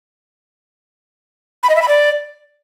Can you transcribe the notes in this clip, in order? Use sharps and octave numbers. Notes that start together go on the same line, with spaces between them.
B5
D#5
E5
B5
D5